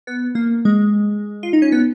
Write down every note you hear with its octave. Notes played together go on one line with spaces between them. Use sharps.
B3
A#3
G#3
F4
D#4
C#4
B3